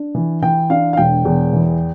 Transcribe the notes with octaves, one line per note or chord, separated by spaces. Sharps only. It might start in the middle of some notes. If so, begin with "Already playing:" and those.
Already playing: D4
E3
E3 G5
D4 F5
F5
E1 G5
E2
E3